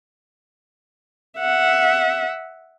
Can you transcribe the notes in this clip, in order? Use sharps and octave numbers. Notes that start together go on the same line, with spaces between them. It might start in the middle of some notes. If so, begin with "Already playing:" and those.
E5 F#5